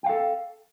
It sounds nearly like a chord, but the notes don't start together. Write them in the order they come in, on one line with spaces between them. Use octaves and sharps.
G5 F5 A4